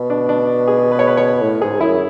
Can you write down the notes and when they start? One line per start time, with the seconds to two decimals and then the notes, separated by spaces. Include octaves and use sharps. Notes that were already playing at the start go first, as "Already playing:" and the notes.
Already playing: B2
0.10 D4
0.29 D4
0.68 G#4
0.92 B4
0.99 C#5
1.07 B4
1.17 C#5
1.42 A2
1.62 G#2 G#4
1.80 F#2 E4